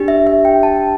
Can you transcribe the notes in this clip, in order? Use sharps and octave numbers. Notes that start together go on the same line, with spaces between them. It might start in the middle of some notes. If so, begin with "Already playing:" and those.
Already playing: D4 G4
E5
E5
G5
A5